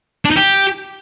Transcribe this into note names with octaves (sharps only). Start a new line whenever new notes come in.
D4
D#4
G4